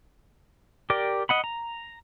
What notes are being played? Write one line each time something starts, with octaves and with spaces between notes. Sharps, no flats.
G4 A#4 D5 G5
D#5 F#5 B5
A#5